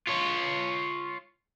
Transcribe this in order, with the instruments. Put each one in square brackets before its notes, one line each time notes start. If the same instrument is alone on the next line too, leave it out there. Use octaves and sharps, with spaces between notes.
[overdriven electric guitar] F4 C#5